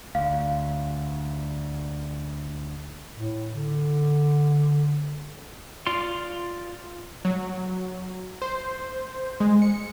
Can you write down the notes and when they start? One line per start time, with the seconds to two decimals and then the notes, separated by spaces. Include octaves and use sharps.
0.15 D2 F5
3.16 A2
3.53 D3
5.87 F4 D5 C6
7.25 F#3
8.42 C5
9.40 G#3
9.62 C#7